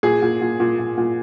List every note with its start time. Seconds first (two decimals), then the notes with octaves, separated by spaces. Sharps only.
0.03 A#2 G#4
0.22 A#2
0.42 A#2
0.60 A#2
0.79 A#2
0.98 A#2